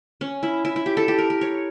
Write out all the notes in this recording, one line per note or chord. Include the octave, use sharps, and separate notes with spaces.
C#4
E4
E4
E4
G4
A4
G4
A#4
A#4
C#5